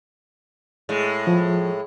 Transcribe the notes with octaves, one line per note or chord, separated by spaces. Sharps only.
A2 G#3
F3